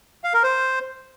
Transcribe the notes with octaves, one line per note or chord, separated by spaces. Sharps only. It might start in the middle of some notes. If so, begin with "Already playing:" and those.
F5
A#4
C5